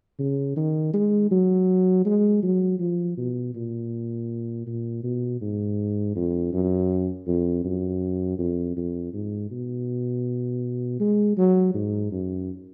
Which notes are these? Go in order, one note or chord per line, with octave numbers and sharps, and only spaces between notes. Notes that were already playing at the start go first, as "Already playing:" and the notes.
C#3
D#3
G#3
F#3
G#3
F#3
F3
B2
A#2
A#2
B2
G#2
F2
F#2
F2
F#2
F2
F2
G#2
B2
G#3
F#3
G#2
F#2